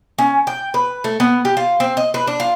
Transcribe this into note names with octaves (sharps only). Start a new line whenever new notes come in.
C#4
G5
B4
A3
B3
G4
F4
C4
D#5
B4
D4
F4